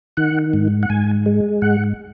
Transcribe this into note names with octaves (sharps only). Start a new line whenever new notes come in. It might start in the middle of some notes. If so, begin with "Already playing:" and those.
D#3 F#5
G#2
F#5
G#2 G#5
G#3
G#2 F#5